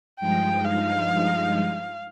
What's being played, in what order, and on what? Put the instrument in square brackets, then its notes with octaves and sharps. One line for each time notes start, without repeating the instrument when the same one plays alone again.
[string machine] G2 F3 G#3 D#4 [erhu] G5
[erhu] F5